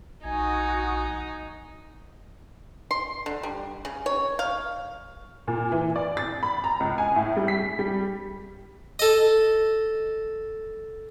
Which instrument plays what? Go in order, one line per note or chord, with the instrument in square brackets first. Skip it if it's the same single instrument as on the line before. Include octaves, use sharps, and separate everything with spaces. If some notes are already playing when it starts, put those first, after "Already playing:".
[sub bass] A#1 [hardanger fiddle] D#4 [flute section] F#4 D#6 [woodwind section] G#5
[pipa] C6
D3
G3
C#3
C#5
F5
[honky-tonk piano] A#2
E3
D5
A6
B5
A#5
C#2
G#5
A2
G3
B6
G3
[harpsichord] A4 D#5